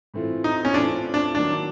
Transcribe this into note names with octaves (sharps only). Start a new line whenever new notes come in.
A2 E3 A3 C4 F4
D#4
C#4
A2 E3 A3 C4 D4 F4
D4
D#3 F#3 A#3 D4